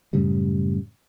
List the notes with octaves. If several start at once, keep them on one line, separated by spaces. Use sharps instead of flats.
F#2 A2 C#3 G3